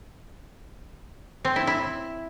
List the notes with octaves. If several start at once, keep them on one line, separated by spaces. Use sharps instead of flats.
C4
E4
E4